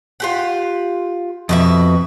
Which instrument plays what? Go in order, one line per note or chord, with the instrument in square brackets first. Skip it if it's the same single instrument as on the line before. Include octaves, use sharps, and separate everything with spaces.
[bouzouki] F4 G4 F#5
[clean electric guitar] F2 [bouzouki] B2 F#4 E5